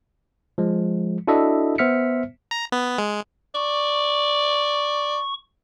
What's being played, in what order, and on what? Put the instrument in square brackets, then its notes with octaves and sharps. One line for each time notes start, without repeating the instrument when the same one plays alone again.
[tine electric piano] F3 G#3
D4 E4 F#4 A4 D#5 E5
B3 C5 E5 F6 B6 C#7
[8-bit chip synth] A#5
B3
G#3
[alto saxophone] D5 [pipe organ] C#6